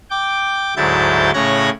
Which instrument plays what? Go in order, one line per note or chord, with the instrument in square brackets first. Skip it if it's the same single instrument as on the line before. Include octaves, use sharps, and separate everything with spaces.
[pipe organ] G5 D6
D2 G#2 F#3 E4 G6 A6
A2 C#3 C#5 F#6 G#6 A#6